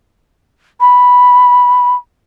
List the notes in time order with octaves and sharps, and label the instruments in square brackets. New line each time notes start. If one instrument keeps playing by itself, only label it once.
[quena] B5